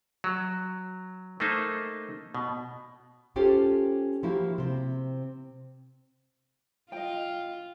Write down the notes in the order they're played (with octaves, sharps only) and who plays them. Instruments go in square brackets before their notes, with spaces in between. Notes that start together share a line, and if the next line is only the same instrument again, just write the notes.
[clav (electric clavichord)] F#3
A3 A#3 D#4 C5 E5
B2
[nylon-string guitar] C#4 F4 G4 A4 C5
F3 A#3 E4 F#4 G4
C3 C4
[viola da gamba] F4 [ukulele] D#5 G5